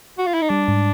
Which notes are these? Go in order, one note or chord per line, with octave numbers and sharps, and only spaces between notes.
F#4
F4
E4
D#4
G3 D4
G#2